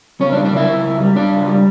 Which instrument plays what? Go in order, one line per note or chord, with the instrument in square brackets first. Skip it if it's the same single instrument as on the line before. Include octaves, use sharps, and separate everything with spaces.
[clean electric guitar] C#2 C#4 C#5
D4 D5
G3
D4 D5
C#3 E4 E5
C#2
C#2
G3
G3 D4 D5
C#2
G3